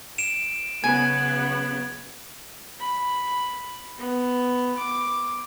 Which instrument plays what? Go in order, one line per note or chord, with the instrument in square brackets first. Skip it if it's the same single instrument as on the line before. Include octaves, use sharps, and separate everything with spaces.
[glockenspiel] D7 E7
[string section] C#3 F#3 B3 [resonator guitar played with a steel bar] G#5 [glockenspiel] G#6
[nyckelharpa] B5
B3
D6